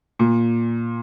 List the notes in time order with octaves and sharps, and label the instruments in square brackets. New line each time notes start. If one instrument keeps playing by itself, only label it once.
[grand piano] A#2